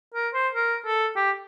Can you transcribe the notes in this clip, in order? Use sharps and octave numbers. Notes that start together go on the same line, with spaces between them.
A#4
C5
A#4
A4
G4